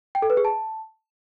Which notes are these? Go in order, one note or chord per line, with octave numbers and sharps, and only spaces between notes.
G5
A4
B4
G#4
A5